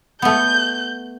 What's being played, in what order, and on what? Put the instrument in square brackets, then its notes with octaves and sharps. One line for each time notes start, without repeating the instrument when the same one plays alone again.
[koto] A3 B3 [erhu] G6